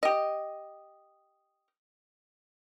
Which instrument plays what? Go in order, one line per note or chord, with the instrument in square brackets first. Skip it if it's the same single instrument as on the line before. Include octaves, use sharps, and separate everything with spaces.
[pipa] G4 D#5